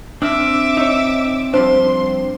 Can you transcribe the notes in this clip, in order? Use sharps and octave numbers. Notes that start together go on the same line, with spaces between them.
C4 D4 E5 D6 E6 F6
D#4 C#5
F3 G3 D4 C5 C6